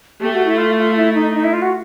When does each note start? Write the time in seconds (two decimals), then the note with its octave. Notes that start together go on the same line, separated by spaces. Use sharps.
0.20 A3 G4
0.34 F#4
0.46 E4
0.58 F4
0.78 F4
0.96 E4
1.15 D#4
1.34 D#4
1.44 E4
1.53 F4
1.62 F#4